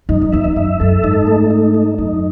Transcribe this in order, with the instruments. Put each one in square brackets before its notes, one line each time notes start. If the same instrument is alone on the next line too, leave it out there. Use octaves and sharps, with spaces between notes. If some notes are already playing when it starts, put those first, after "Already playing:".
[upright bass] F#2 [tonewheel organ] D#4
[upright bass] F#2
[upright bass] E2 [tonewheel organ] E5
[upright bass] E2
[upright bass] F#2 [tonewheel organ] E5
[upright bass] F#2 [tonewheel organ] A4
[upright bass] G#2 [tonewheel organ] D#4
[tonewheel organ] A3
D#4
D#4
[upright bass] F#2 [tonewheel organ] D#4